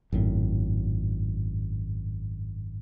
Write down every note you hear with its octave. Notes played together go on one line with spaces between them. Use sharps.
G#1 F#2 A2